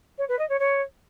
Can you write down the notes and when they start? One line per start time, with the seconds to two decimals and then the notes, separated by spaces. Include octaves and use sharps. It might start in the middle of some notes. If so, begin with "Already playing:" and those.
0.18 C#5
0.28 B4
0.39 D#5
0.49 C#5
0.59 C#5